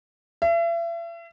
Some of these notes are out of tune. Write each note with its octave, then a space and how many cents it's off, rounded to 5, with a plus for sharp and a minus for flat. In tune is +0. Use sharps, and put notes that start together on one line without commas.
E5 +40